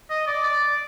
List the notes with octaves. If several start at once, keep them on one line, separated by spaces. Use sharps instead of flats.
D#5
D5
D5